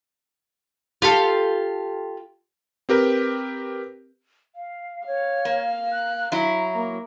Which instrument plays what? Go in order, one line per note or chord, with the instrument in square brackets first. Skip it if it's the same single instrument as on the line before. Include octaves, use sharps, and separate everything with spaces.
[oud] F4 G4 A4
[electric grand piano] C4 G4 A#4 B4
[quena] F5
[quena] C#5 [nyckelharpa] F5
[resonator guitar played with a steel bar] A#3
[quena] F#6
[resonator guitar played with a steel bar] F#3 E4 [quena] A#5
[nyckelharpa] A#3